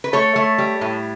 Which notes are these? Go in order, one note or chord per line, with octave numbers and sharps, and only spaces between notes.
B4
A3 A4 C#5
A3
G3
A2